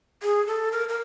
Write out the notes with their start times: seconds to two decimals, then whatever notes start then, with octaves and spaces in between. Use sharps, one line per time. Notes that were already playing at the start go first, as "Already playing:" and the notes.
0.23 G#4
0.47 A4
0.72 A#4
0.89 A#4